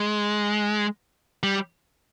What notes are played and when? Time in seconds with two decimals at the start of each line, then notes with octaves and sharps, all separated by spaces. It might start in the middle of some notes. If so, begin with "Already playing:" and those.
Already playing: G#3
1.43 G3